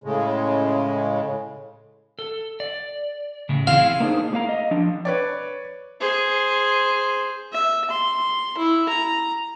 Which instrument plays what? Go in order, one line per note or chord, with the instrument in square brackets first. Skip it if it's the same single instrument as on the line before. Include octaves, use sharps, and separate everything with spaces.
[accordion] A2 C#3 G#3
[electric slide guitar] A4
D5
A2 C#3
[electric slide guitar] C4 E4 G#4 [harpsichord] F5
[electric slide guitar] A#3 D4 D#4 G#4 C5
A2 A#3 F5 A#5
D#5 F5
F3 D4
[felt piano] B4 C#5 D5
[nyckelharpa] G#4 C5
E5
C6
E4
A#5